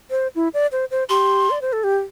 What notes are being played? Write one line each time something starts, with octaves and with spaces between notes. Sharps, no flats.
C5
E4
D5
C5
C5
G4 C6
D5
C5
A4
G4